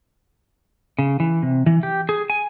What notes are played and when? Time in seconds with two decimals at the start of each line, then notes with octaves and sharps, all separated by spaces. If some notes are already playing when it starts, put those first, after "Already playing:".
0.99 C#3
1.20 E3
1.42 C3
1.66 E3
1.83 G4
2.09 G#4
2.30 G#5